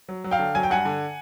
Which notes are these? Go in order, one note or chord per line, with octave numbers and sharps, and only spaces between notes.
F#3
F#3
F5 G5
D3
F#3 G#5
G5
G2 F#5 G#5
D3